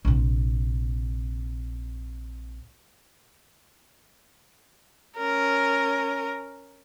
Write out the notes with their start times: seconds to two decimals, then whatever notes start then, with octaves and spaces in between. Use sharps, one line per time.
0.05 A#1 C3
5.17 C#4 A#4